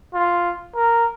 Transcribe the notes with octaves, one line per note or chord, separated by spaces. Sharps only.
F4
A#4